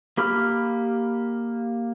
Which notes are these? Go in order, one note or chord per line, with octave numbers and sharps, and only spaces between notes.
A#3 G4 B5 F6